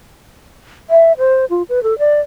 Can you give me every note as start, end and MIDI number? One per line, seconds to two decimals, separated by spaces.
0.90 1.13 76
1.18 1.45 72
1.50 1.63 65
1.69 1.82 71
1.83 1.98 69
1.99 2.20 74